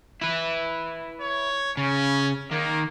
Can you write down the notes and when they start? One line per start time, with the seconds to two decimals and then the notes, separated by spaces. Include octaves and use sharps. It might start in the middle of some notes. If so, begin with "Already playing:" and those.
0.21 E4 B4
1.21 C#5
1.77 C#3 C#4
2.51 D#3 A#3